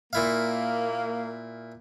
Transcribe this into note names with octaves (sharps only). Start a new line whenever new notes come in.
A#2 A#3 E4 F5